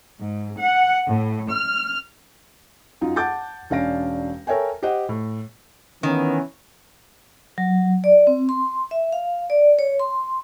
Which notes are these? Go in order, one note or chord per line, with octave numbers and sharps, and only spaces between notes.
G#2
F#5
A2
F6
F#2 D#4 F4
F#5 A5 D6 G6 A6
E1 C#4 D4 F5 A#6 D7
A4 A#4 C#5 E5 G5 G#5
G4 C5 D#5 F#5
A2
D#3 E3 B3 C#4
F#3
D5
C4
C6
E5
F5
D5
C#5
C6